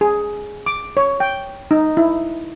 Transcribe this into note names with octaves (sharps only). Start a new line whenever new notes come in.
G#4
D6
C#5
G5
D#4
E4